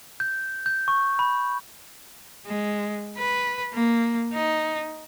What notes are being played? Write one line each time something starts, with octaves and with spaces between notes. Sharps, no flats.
G6
G6
C#6
B5
G#3
B4
A#3
D#4